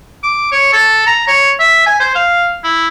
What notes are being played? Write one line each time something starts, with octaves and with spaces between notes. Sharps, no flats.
D6
C#5
A4
A#5
C#5
E5
G#5
C5
F5
E4